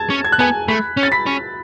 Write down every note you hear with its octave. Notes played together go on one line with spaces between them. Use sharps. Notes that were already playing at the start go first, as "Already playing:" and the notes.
Already playing: A5 G#6 A6
C#4
G#6
F#6
B3 G#5 G#6
A3 B5 B6
C#4
A6
B5 B6
C#4